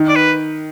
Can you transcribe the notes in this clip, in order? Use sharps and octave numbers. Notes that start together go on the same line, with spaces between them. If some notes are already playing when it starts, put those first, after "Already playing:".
Already playing: D#3
D5
B4